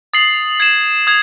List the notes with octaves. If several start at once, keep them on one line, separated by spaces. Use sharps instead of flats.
D#6 A6 C7 F#7
G#6 C7 E7
D#6 G#6